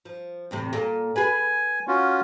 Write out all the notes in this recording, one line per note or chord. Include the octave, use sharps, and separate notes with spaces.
F3
E2 A2 C3
A#2 A4
G#4 B4 G#5
C#4 F4 F#4